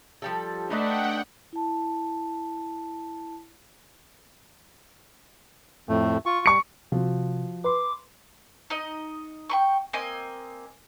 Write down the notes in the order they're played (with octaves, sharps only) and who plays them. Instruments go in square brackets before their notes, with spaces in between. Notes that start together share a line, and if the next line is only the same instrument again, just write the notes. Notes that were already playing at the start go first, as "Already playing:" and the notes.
[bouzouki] F3 G3 A4
[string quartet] A3 [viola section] D4 [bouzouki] D#4 B4 D#5 [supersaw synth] F#5 G5
[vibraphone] E4 A5
[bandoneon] F2 A2 A3
F4 C#6
[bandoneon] G3 [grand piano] C#6 C#7
[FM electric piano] C3 [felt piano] F3 F#4
[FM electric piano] B4 C6 [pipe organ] D6
[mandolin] D#4 D#5
G5 B5 C#6
A#3 C4 D#5 G#5